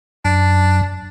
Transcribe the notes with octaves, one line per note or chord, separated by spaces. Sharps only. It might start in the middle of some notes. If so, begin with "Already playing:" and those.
F#2 D4